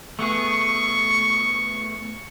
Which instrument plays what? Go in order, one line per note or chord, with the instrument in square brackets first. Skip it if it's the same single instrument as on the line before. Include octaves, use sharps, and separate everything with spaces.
[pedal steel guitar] A3 B3 G#4 [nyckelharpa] C#6